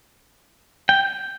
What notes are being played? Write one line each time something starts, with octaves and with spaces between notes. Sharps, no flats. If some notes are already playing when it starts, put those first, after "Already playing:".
G5